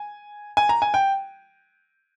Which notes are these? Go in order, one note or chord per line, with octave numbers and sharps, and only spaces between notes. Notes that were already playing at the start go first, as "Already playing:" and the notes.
Already playing: G#5
G#5
A#5
G#5
G5